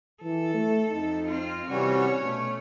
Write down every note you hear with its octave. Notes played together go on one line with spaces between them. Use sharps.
E3 A4
A3
F2 D#4
C4 F4
C3 E3 G3 C#4 F#4 C#5
B2 A3